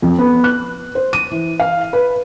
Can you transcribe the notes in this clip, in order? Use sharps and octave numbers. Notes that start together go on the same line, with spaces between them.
F2
B3
F#6
C5
D#7
E3
F5
B4